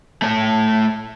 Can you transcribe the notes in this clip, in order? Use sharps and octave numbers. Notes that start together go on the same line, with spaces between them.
A3 C#5